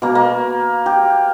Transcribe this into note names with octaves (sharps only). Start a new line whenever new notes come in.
B2 A#3
A#3
G4